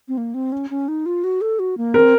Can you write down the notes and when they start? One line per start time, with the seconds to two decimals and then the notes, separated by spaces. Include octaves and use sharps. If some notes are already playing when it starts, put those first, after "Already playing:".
0.08 C4
0.17 A#3
0.34 C4
0.52 C#4
0.70 C#4
0.88 D#4
1.06 F4
1.24 F#4
1.41 A4
1.59 F#4
1.77 A#3
1.94 C4 A#4